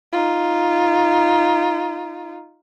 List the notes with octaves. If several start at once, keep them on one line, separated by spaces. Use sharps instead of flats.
D#4 F4